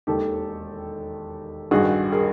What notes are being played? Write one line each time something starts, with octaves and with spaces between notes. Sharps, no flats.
E1 D#2 D#3 G4 A4
A1 G2 D#3 F#4 G#4
G#4 A#4